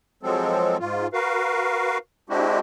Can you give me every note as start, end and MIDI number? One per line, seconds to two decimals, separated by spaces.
0.23 0.77 53
0.23 0.77 54
0.23 0.77 56
0.23 0.77 60
0.23 0.77 69
0.80 1.07 44
0.80 1.07 65
1.13 1.98 66
1.13 1.98 70
1.13 1.98 71
1.13 1.98 77
2.30 2.59 56
2.30 2.59 60
2.30 2.59 62
2.30 2.59 64
2.30 2.59 66
2.30 2.59 67